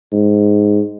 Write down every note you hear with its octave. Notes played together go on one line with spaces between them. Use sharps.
G#2